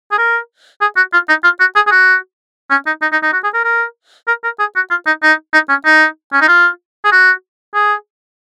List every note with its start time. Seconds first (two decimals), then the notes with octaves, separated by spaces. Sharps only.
0.12 G#4
0.18 A#4
0.81 G#4
0.97 F#4
1.13 F4
1.29 D#4
1.44 F4
1.60 F#4
1.75 G#4
1.87 G#4
1.91 F#4
2.71 C#4
2.86 D#4
3.02 D#4
3.12 D#4
3.23 D#4
3.33 F#4
3.44 G#4
3.54 A#4
3.64 A#4
4.28 A#4
4.44 A#4
4.59 G#4
4.75 F#4
4.90 F4
5.07 D#4
5.23 D#4
5.53 D#4
5.69 C#4
5.85 D#4
6.33 C#4
6.41 D#4
6.48 F4
7.05 G#4
7.12 F#4
7.75 G#4